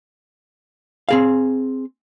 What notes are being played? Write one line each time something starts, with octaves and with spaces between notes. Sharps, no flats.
C4 G#4 F5